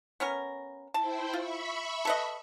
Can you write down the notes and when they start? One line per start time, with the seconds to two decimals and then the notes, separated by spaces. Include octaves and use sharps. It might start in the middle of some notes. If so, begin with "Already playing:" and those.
0.20 B3 C#4 A#4
0.94 E4 C5 G5 A5
1.33 F4 E5 B5 C#6
2.05 A4 B4 D#5